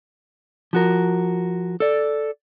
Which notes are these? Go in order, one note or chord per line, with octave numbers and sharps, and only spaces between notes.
F3 F#4 A#4
A4 D5